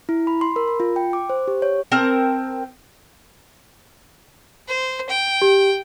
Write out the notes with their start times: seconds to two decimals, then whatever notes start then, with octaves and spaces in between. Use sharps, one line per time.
0.09 E4
0.27 B5
0.41 C6
0.56 A#4
0.68 B5
0.80 F4
0.96 G5
1.13 D6
1.30 C5
1.48 G4
1.62 C#5
1.92 C4 A#4 A5
4.68 C5
5.09 G5
5.42 G4